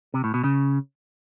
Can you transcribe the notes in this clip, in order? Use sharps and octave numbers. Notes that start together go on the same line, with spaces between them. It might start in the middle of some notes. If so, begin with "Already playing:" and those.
C3
A2
B2
C#3